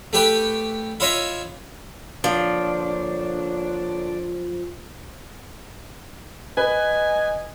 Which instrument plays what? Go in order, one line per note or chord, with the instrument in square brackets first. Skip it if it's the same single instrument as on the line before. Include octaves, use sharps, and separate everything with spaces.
[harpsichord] A3 G4 B4 G5
E4 F4 C#5 D#5 E5
[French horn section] A#2 D3 C#5 [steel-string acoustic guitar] F3 [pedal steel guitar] D4
[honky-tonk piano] B4 [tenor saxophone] D#5 [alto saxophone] G#5